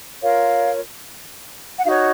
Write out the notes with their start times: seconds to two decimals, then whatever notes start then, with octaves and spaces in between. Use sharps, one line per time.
0.22 F4 A#4 C#5 F5
1.79 F#5
1.85 D#4 F#4 C#5 F5